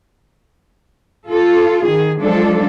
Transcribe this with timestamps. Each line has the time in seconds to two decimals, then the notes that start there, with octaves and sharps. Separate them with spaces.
1.28 F4 A4
1.83 D#3 G#4
2.18 F3 F#3 G#3 D4 F4 A4